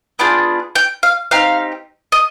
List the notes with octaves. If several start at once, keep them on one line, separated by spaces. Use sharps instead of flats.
B3 D4 F4 G#4 G5
G5
F5
C4 D#4 G4 F5
D#5